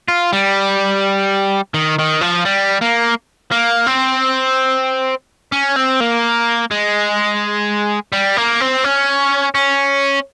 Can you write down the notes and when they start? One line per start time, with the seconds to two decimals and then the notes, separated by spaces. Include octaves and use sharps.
0.08 F4
0.33 G3
1.74 D#3
1.99 D#3
2.21 F3
2.45 G3
2.81 A#3
3.51 A#3
3.87 C4
5.52 C#4
5.76 C4
6.00 A#3
6.71 G#3
8.12 G3
8.37 A#3
8.60 C4
8.84 C#4
9.55 C#4